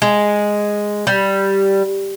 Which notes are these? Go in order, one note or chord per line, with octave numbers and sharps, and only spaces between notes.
G#3
G3